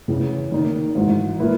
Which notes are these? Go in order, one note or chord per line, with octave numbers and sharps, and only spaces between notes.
E2 C#3 E3
D#3 A#3 D#4
G#1 G#2 E3
A#2 A#3 E4 B4